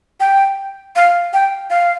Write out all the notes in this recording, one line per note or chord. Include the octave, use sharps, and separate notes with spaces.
G5
F5
G5
F5